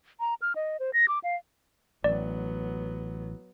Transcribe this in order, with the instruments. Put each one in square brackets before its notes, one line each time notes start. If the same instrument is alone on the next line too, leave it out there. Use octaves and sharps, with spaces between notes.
[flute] A#5
F6
D#5
C5
A#6
D6
F5
[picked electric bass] A1 [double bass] F#3 B3 [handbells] D5